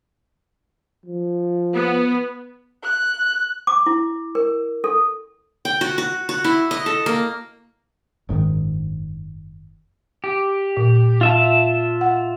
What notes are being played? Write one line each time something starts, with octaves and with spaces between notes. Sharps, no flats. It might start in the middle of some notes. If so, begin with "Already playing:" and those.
F3
B3
F#6
D6
E4
A#4
A4
G5
F#4
F#4
F#4
E4
D#5
A4
A#3
F#1 G#2 C3 D#3
G4
A#2
F4 E5 A5
F#5